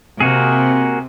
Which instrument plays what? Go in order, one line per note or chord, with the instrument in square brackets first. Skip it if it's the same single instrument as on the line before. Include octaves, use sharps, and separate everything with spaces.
[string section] C3 [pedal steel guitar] A#3 F#4 G#4